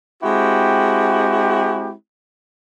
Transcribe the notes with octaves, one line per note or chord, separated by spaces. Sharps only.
G#3 C4 E4 F#4 G4